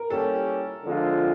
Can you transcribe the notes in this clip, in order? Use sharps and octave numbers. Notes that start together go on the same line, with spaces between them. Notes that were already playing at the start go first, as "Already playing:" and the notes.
Already playing: A#4
G3 A#3 C#4 E4 G4 A4
D3 F3 G#3 C4 F4